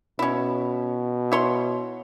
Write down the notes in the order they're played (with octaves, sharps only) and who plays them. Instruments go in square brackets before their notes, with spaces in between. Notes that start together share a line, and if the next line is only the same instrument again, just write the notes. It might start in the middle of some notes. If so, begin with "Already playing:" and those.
[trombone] B2 [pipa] C#4 E4
[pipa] E4 C#5 C6